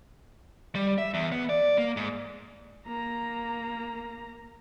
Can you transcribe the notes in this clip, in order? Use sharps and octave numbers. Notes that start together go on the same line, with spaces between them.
G3
E5
E2
B3
D5
A#3
G#2
A#3 A#5